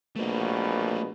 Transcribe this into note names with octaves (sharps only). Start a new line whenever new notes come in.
A#1 B2 A3 A#3